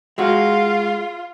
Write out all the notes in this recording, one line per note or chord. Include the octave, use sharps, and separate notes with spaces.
G#3 F4 F#4